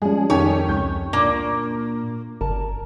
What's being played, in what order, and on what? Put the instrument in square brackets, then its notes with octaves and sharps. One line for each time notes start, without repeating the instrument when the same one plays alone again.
[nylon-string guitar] F3 G3 C#4 [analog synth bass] G#3 [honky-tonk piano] G#4
[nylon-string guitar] F2 [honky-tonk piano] D#3 C#4 G4 [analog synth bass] D#4 [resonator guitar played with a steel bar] C#5
[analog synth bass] C#2 [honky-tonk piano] C#6 G6
[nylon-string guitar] A#2 [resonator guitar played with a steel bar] A#3 [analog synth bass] D4
[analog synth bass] G1 [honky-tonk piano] A#4 [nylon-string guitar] A5